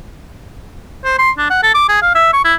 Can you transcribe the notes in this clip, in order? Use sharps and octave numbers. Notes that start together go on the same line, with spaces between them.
C5
C6
D4
F#5
A4
D6
G#4
F5
E5
C#6
E4